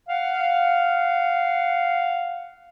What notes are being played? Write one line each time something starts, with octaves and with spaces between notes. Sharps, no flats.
F5 F#5